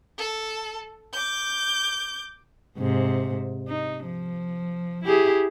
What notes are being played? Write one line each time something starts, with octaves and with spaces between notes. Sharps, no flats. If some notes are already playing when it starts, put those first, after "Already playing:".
A4
D6 G6
G#2 C3
D#4
F3
E4 G4 G#4